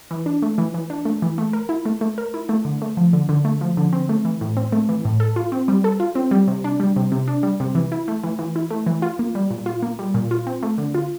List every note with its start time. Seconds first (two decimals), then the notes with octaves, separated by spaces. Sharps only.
0.11 E3
0.26 D4
0.42 A3
0.58 E3
0.74 E3
0.90 D4
1.05 A3
1.22 E3
1.38 A3
1.53 A#4
1.69 E4
1.85 A3
2.01 A3
2.18 A#4
2.34 E4
2.49 A3
2.65 D3
2.82 A3
2.97 F3
3.13 D3
3.29 D3
3.45 A3
3.61 F3
3.77 D3
3.93 C4
4.09 A3
4.25 E3
4.41 A2
4.57 C4
4.72 A3
4.89 E3
5.05 A2
5.20 A4
5.36 F4
5.52 C4
5.68 G3
5.84 A4
6.00 F4
6.15 C4
6.31 G3
6.48 C3
6.64 D4
6.80 G3
6.96 C3
7.12 C3
7.28 D4
7.43 G3
7.60 C3
7.75 E3
7.92 E4
8.08 A3
8.24 E3
8.39 E3
8.56 E4
8.71 A3
8.86 E3
9.02 F4
9.19 A#3
9.35 G3
9.51 A#2
9.66 F4
9.83 A#3
9.99 G3
10.14 A#2
10.31 F4
10.47 C4
10.63 A3
10.78 D3
10.95 F4